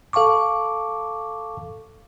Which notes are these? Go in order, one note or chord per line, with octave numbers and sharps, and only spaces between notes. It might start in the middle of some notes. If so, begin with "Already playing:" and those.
A4 F5 A5 C#6 D6